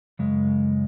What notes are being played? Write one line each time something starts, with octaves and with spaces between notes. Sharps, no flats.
F#2 C#3 G#3